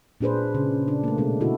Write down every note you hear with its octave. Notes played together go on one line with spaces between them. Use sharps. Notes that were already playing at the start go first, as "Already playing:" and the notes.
A#2 D4 G#4 B4 C5
C#3
D4
A3 A#3
B2 G#3 D4
D3 E4 F#4 A4